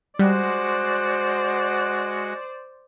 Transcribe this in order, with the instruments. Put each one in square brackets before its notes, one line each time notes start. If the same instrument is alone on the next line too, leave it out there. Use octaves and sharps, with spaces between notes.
[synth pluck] G3 [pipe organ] G#3 F#4 F#5 [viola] C5 D5